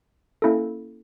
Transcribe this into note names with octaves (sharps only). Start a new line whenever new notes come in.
A#3 C#4 E4 A4